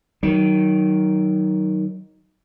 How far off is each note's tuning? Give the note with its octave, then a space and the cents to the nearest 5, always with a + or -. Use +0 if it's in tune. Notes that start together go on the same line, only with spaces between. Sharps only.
D#3 +0 F#3 +20